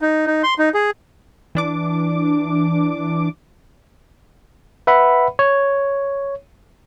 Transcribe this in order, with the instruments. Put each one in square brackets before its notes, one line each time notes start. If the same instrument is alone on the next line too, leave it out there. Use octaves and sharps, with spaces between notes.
[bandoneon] D#4
D#4
C6
D#4
G#4
[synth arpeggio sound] E3 D4 D6
[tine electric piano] B4 E5 F#5 B5
C#5